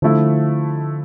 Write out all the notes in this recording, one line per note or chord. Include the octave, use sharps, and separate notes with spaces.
D3 F3 A3 E4